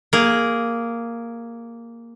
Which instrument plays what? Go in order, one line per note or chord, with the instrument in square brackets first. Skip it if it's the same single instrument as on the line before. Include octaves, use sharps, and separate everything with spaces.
[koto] A#3 G#4